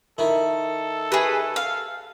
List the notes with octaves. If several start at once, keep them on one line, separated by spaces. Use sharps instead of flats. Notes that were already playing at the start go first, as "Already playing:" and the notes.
D#3 E4 A4
G4 G#4 B4 E5
F5